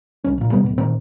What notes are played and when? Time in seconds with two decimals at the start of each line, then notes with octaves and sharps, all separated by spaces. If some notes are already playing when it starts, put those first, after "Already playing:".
0.24 C2 C#4
0.38 A#1 A#2
0.52 D#2 C3 G3 B3
0.64 D1 B2
0.78 A#2 D#3 C4